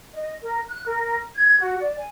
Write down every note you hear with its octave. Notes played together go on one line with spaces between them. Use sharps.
D#5
A#4
F#6
A#4
G#6
F#4
D5
G#5